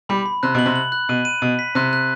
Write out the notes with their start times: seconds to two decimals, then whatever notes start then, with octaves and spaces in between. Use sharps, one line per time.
0.09 G3 B5
0.26 B5
0.43 C3 F#6
0.55 B2 F#7
0.66 C3
0.76 F#7
0.92 F#6
1.09 B2 D#7
1.25 D#7
1.42 B2 D#7
1.59 B6
1.75 C3 F#6
1.93 F#6